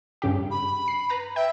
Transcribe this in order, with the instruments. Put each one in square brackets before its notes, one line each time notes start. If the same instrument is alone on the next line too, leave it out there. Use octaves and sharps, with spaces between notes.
[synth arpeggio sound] G2 C#3 G4
[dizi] B5
[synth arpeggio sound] C7
B4 A#5
[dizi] E5 [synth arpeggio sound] G5